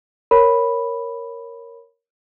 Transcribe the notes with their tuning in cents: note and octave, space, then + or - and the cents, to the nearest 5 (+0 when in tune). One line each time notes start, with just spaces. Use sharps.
A#4 +0 C#5 -5 B5 +0